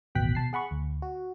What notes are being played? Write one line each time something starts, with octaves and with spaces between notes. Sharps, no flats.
A1 D#2 B2 G5 F#6 B6
B2 A5 C7
G#4 F#5 B5 C#6
D2
F#4